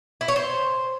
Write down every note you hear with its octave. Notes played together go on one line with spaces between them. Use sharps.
E4
C#5
C5